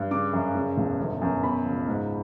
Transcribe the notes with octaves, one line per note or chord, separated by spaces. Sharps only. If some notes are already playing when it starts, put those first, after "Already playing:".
Already playing: G2
C#3 D6
F#2
C#3
E1
G1
F#2
B2 B5
C#2
G#2